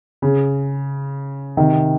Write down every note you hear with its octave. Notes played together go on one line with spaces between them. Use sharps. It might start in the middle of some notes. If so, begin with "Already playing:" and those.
C#3
C3 D#3